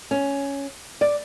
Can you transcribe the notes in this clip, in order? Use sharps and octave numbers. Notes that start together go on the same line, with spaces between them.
C#4
D5